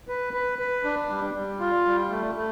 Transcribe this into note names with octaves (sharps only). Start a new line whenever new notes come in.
B4
B4
B4
D4
G3
G3
F4
G3
A3
A3